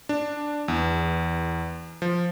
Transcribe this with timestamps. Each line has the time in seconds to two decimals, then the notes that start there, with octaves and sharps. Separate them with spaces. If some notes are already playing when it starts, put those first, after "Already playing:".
0.09 D4
0.68 E2
2.02 F3